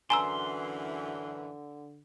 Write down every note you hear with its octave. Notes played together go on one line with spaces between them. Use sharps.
F#2 D3 E3 G#5 A#5 C6 E6